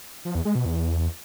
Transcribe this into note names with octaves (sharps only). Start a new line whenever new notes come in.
F3
E2
G#3
B2
E2